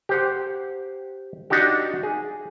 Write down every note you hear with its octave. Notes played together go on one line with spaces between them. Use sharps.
G4 C5 F#5
D4 D#4 F#4 G4
G#4